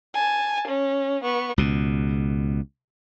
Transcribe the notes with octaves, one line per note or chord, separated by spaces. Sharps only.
G#5 A5
C#4
B3 C#6
C#2 B2